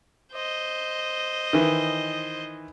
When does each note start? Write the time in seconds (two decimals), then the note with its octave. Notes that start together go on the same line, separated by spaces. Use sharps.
0.33 C5 D#5
1.53 D#3 E3